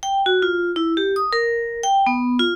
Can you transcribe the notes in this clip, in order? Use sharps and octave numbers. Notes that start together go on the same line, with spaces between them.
G5
F#4
F4
E4
G4
D#6
A#4
G5
B3
F4